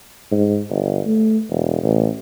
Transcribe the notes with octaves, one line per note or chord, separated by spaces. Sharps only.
G#2
G1
A3
E1
A1